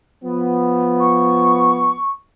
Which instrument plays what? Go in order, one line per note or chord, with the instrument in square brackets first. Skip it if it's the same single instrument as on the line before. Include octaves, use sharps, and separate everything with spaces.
[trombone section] F3 B3
[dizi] C#6